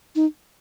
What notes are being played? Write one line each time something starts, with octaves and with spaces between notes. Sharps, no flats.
D#4